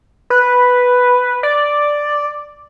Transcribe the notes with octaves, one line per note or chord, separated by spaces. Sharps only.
B4
D5